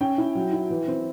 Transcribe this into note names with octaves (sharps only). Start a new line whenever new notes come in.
C#4 G5
E4
F#3
E4
E3
C4